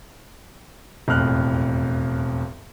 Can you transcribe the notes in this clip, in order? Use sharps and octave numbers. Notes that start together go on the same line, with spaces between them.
E1 F2 A2 F6 F#6